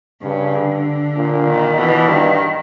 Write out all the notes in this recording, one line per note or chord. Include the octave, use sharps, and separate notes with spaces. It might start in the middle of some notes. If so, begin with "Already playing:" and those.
G2 C#3
D3
A#2
D#3
B2 E3
G2 D#3